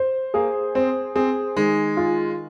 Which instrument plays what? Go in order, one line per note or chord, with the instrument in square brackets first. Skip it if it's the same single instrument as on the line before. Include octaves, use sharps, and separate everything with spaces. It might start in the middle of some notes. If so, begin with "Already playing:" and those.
Already playing: [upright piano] C5
[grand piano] A#3 [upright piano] G#4
[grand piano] C4 [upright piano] C5
[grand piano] C4 [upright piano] G#4
[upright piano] D#3 [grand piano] G#3
[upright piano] F4